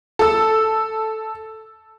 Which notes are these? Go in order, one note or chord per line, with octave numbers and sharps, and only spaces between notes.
A4 E6